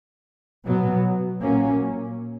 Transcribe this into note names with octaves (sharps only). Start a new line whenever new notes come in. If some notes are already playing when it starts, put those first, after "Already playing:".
B2 F#3 B3
A#2 F#3 A#3 C#4